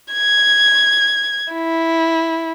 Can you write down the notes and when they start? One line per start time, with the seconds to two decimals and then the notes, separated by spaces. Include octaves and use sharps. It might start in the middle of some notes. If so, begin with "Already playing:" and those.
0.13 G#6
1.53 E4